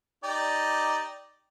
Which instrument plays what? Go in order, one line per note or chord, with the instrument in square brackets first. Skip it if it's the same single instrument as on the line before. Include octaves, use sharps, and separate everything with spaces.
[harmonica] D#4 G4 D5